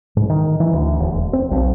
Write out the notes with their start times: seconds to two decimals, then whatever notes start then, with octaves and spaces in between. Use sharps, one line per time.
0.17 G#2
0.29 D#3
0.60 E3
0.74 D2
1.00 E1
1.14 E1
1.33 C4
1.51 B1